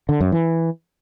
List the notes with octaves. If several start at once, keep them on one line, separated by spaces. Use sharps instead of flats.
D3
F#2
E3